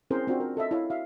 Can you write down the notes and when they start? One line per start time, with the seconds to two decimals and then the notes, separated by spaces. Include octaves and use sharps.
0.11 C4 C#4 E4 G#4 A#4 C5
0.28 C4 D4 F4 F#4
0.40 A#4
0.57 A4 D#5 E5
0.71 E4 C#5 F5
0.90 F#4 E5 F5